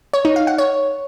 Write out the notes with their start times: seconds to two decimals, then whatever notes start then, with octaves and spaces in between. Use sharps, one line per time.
0.13 C#5
0.25 D#4
0.36 F5
0.47 F#5
0.58 C#5